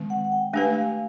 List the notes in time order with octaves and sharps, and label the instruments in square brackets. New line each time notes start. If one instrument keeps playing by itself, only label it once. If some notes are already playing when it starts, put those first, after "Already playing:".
Already playing: [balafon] D#3 G#3 C4
[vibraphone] F#5
F#5
G5
[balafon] A3 D4 G4 B4 [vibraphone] G#5
[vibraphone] F5